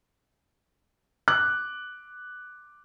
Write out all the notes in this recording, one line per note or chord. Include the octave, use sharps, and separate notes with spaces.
D6 F#6